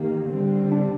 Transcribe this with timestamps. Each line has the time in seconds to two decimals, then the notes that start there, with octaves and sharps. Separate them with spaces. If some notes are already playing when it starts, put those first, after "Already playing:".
Already playing: D#3 A#3 G4
0.29 D3 G3 C4
0.72 D4